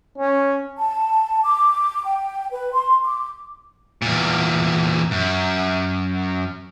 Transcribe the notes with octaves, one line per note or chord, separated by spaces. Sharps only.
C#4
A5
D6
G5
B4
C6
D6
E2 A#2
F#2